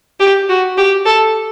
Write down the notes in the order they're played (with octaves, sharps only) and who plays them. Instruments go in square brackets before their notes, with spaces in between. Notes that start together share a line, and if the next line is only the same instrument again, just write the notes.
[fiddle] G4
F#4
G4
A4